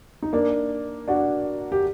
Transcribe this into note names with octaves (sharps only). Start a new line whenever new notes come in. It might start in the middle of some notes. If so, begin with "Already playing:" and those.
D#4
A#3 D4
D4 F#4
G4